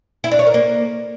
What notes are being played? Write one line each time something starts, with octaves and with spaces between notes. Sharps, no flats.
E4
D4
C#5
A#4
A#3